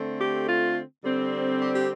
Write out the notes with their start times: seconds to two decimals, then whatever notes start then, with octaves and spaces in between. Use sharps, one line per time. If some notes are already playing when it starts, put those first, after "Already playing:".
Already playing: D3 A3 C4
0.19 G4
0.47 F4
1.03 D3 G3 C4
1.61 G4
1.75 G4